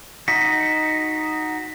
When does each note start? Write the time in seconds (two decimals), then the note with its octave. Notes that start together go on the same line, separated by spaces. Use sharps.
0.28 D#4 F#4 B6